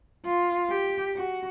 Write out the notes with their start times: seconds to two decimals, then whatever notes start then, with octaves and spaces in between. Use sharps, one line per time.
0.25 F4
0.70 G4
1.16 F#4